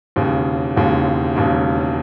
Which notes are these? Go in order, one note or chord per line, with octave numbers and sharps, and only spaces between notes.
E1 D#2 C#3
E1 D#2 C#3
E1 D#2 C#3